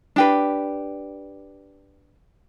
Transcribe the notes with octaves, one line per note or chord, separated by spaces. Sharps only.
D4 G4 B4